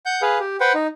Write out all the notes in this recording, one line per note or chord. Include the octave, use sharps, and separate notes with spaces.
F#5 G6
G#4 B4 F5
G4
B4 C5 F#5 G5
D#4